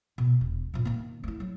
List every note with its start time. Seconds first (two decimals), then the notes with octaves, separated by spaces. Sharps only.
0.18 B2
0.41 E1
0.74 F#2 A#2
0.85 D#3 A#3
1.24 A3 E4
1.40 F#3